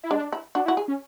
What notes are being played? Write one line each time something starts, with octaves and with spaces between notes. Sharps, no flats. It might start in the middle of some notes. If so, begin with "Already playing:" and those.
E4
G#3 D4
E4
D4 F#4
E4 F#4
G#4
C#4